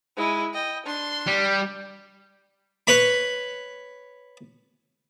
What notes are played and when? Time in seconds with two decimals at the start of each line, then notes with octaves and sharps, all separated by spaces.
0.17 G#3 E4
0.54 D#5 G5
0.86 D4 C6
1.27 G3
2.87 B4 C#5 B5